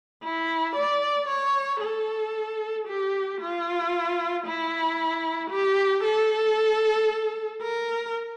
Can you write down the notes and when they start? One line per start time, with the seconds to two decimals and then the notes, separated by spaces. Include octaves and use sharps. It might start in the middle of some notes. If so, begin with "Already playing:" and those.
0.24 E4
0.76 D5
1.29 C#5
1.81 A4
2.87 G4
3.41 F4
4.46 E4
5.51 G4
6.03 A4
7.63 A#4